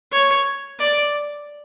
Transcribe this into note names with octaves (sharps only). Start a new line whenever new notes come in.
C#5
D5